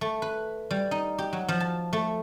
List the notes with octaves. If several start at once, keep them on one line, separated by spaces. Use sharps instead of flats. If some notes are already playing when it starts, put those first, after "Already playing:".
A3
B4
G3
D#4
G4
F#3
F3
A5
A3